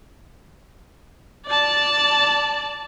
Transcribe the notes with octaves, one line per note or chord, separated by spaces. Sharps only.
D5 A5